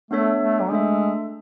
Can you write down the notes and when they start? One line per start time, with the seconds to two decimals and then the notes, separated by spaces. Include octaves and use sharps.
0.11 A3 B3 D4 A4 C#5 E5
0.41 A3
0.61 F#3
0.70 G#3 A3 D4 A4 E5